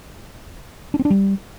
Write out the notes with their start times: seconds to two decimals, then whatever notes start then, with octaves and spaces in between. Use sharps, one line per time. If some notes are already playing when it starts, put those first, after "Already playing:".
0.94 D4
0.99 C4
1.05 D4
1.10 G3